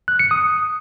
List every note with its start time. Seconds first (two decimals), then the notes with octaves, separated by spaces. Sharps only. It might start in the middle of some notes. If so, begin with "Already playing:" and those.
0.08 F#6
0.19 C#7
0.31 D#6